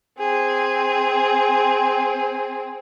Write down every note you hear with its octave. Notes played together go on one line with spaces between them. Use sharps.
C4 G#4